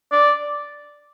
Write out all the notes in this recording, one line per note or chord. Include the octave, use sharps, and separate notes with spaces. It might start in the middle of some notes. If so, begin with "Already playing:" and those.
D5